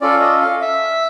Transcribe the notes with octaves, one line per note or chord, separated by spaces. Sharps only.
C#4 F4 A4 D5
D#5
F5
E5